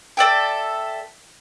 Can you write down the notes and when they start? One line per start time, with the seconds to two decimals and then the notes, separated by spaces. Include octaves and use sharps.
0.17 A4 D5 E5 G5